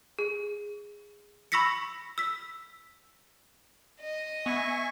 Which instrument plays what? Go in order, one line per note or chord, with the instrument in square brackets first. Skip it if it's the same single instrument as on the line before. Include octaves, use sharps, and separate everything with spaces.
[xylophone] G#4
B5 C#6 E6 A#6 B6 C#7
E6 B6
[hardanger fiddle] D#5
[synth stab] B3 [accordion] E5 G#5 C#6